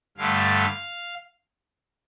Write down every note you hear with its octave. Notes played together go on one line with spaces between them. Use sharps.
G2 D3 A3 F5